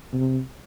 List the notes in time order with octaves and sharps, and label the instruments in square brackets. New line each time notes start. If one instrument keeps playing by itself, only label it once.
[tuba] C3